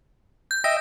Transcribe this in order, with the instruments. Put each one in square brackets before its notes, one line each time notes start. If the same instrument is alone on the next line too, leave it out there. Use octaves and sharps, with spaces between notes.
[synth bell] G6
[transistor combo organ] D#5 E5 G5 [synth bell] A#6